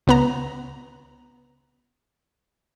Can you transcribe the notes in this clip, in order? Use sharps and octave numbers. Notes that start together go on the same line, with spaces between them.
C#2 B3 A#5